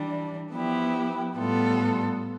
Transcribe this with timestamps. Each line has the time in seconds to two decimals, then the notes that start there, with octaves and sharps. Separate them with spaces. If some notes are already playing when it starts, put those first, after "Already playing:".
Already playing: E3 G3 D4
0.53 F3 B3 E4 G4
1.36 A2 G3 B3 F4 A4